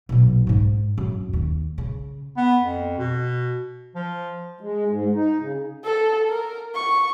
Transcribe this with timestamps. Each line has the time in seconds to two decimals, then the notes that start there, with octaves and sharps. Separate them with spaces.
0.09 B1 A#2
0.47 G#2 D#4
0.98 F#2
1.33 D#2
1.78 C#3
2.37 B3
2.62 F2
2.98 B2
3.95 F3
4.61 G#3
4.88 G#2
5.15 D#4
5.41 C#3
5.84 A4
6.29 A#4
6.75 C#6